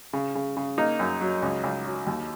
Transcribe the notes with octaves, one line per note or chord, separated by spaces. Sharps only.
C#3
C#3
C#3
A#3 D#4
F#2
F#3
C#2
C#2
F#3
D#2